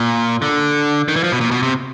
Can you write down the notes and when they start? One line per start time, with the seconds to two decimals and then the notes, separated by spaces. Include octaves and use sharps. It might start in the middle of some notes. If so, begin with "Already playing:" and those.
Already playing: A#2
0.42 D3
1.08 D#3
1.16 E3
1.24 F3
1.32 B2
1.41 A#2
1.51 B2
1.63 C3